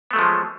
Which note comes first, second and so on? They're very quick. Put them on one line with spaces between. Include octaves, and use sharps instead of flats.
B3 A3 F#3 F3 G#3